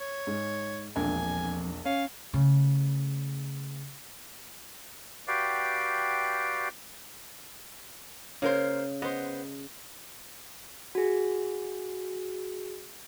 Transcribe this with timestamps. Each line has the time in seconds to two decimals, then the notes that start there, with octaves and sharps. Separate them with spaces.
0.01 C#5
0.27 G#2
0.96 E1 A#1 F2 D4 G#5
1.86 C#4 F5
2.34 C#3 A3
5.28 F#4 G4 B4 D5 F5 G5
8.42 C#3 A#3 A#4 C5
9.02 B3 C5 D#5
10.95 F#4 G#4